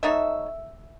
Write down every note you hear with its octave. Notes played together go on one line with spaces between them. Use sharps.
F#3 A3 D#4 E5